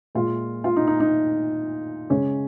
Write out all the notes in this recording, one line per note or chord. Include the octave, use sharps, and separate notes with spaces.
A#2 G#3 F4
F4
D#4
D#4
D#4
C#3 G#3 C#4